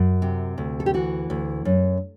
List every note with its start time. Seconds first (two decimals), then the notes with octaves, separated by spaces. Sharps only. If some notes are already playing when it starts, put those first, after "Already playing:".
Already playing: F#2
0.22 C3
0.58 D2
0.80 A4
0.86 G4
0.94 E3 F#4
1.30 D2
1.65 F#2